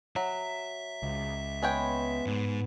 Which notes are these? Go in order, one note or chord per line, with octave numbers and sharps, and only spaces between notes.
F#3 E5
C#2
G#3 B3 C#5 G5
G#2